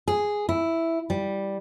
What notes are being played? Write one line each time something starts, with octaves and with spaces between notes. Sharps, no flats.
G#4
E4
G3